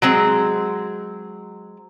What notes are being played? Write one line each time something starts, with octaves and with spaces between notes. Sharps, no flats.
F#3 G#3 C4